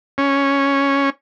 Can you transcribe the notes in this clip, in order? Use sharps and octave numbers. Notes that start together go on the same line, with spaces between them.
C#4